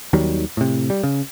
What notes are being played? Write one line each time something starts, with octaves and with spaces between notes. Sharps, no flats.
D#2 D#3 F#3 G3
A2 C3
G3
C#3